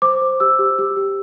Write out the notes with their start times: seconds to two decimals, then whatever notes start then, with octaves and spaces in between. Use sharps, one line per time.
0.02 C5 D6
0.22 C5
0.40 G4 E6
0.59 G4
0.79 G4
0.97 G4